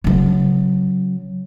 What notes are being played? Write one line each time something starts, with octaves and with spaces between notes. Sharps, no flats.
C#3 F#3